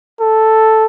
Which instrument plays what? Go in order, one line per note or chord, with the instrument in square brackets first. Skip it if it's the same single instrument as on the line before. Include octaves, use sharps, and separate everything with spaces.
[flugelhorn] A4